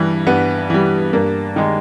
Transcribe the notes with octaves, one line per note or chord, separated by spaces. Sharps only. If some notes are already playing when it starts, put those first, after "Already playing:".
Already playing: G2 E3 G3
G2 B3
E3 G3
G2 A#3
D#3 G#3